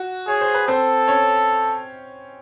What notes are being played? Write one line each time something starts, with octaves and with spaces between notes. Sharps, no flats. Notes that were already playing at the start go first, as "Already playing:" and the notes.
Already playing: F#4
G#4 C#5
C5
B4
C4 A4 C5
C#4 C#5